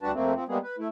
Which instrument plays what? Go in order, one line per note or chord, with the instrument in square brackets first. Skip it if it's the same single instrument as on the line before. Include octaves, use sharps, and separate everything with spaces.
[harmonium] D2 G3 D4 F#4 B4 A5
F2 A3 A#3 C4
F3 C4
G3 G#3 A#3 B3 G#4
B4
A3 E4